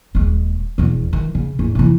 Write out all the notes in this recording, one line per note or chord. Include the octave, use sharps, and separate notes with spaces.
D#1 G#3
E1 E2
D#3 E3
C#3
E2 G#2
C3 E3